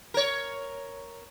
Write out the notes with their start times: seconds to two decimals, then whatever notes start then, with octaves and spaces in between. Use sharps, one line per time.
0.14 A#4 C#5